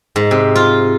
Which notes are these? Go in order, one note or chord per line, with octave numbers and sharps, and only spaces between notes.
G#2
C3
F4